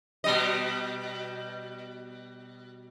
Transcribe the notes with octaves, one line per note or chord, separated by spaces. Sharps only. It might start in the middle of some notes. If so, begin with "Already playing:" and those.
B2 G3 D#5